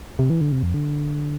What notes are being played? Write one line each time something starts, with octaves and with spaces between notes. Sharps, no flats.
C3
E3
D3
C3
F2
D3